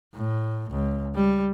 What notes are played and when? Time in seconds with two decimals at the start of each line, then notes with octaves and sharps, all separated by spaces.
0.15 A2
0.70 C#2
1.15 G3